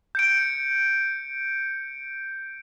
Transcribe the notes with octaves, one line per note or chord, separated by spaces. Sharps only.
G6 C#7 D7